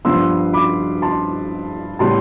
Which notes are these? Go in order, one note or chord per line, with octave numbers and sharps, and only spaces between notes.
G2 F3 B3 C6 E6
B5 D6
A5 C6
A2 G3 B3 A5 C6